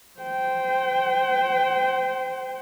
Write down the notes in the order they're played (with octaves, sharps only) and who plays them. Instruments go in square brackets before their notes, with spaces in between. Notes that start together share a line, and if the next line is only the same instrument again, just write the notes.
[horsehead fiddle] C5 G5